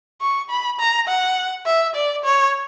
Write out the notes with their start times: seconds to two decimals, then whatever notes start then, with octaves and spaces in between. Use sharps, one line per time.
0.21 C#6
0.50 B5
0.79 A#5
1.08 F#5
1.66 E5
1.95 D5
2.24 C#5